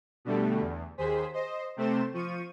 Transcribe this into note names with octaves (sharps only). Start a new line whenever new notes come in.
B2 D3 G3 A3
E2
D#2 G#4 C5 B6
C5 D#5
C3 A3 C4 C5 E7
F3 C#6 D#7